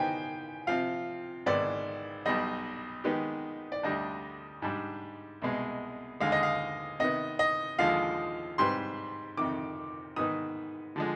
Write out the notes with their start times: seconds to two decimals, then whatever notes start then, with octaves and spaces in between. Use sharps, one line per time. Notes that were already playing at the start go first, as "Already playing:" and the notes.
Already playing: D#3 B3 D#4 G4 C5 G5 G#5
0.67 C3 F3 C4 F4 F5
1.46 G#1 G#2 D#3 B3 D5
2.26 B1 B2 G3 D#5
3.04 D#3 G#3 B3 D#4 G4
3.72 D5
3.83 D2 D3 G3 D4 D#5
4.62 G#2 G3 D4
5.42 C2 B2 G#3
6.20 D#2 D3 G#3 F5
6.32 D#5
6.43 F5
6.99 C3 D#3 B3 D#5
7.39 D#5
7.79 D#2 D3 F3 G#3 F5
8.58 G#2 G3 C4 G4 B4 C6
9.37 F2 C3 D#3 D6
10.16 G#2 D#3 B3 D#4 D#6
10.96 D3 F3 G#3